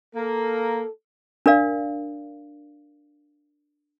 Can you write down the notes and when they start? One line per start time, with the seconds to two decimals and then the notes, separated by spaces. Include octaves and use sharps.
0.15 A#3 A4
1.46 D4 A#4 D5 F5